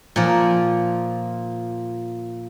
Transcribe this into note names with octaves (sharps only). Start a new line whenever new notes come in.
A#2 F3